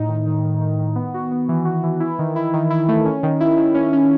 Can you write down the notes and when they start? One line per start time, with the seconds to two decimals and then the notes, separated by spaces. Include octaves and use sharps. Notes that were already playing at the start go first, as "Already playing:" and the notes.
Already playing: A2 D#4
0.09 D#3
0.26 D#3
0.44 D#3
0.61 D#3
0.79 D#3
0.95 B3
1.14 F#4
1.31 B3
1.49 E3
1.65 F#4
1.84 E3
2.00 E4
2.19 D#3
2.36 E4
2.53 D#3
2.70 E4
2.88 A3
3.05 C#4
3.23 D#3
3.40 E4
3.58 D#3
3.74 C#4
3.93 C#4